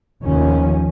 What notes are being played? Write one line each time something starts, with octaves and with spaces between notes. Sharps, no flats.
F1 D#2 D#3 F3 C#4